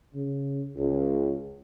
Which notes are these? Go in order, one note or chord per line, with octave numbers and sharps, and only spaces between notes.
C#3
C#2